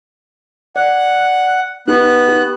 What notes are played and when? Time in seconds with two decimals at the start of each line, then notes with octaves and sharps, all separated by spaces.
0.76 D5 F#5
1.88 B3 D#4 G4 F#6
2.28 G4